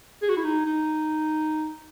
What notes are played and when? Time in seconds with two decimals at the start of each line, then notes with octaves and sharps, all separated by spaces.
0.22 G#4
0.29 F#4
0.37 E4
0.44 D#4
0.66 D#4